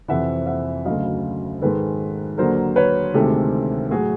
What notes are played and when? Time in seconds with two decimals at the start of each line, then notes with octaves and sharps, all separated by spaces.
0.08 F2 C3 E3 E5 F#5
0.47 E5 F#5
0.86 D2 C#3 F#3 D#5 F5
1.61 G#2 D#3 G#3 A4 B4
2.38 D#2 D3 F#3 A#4 C5
2.76 B4 C#5
3.14 D2 C3 D#3 G#3 G4 A4
3.91 A2 F#3 F#4 G#4